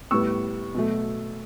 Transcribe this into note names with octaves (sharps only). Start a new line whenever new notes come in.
A2 G3 B3 C#6 E6
B2 F#3 A3